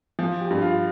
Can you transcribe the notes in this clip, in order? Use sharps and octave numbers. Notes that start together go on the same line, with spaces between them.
F3
G4
G2
F4